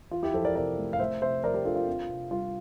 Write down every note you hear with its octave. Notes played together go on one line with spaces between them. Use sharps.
E3 F4
E4 G4
F2 A4 C5
A#4 D5
C3 A#4 D5
A3
F5
A3 C5 E5
C3 C5 E5
F3 A#4 D5
G4 A#4
D4 F4 A4
F4
C4
C3
G3 F4